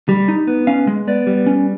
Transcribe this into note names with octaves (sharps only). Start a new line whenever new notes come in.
G3
D#4
B3
C#4 F5
G#3
B3 D5
G3
C#4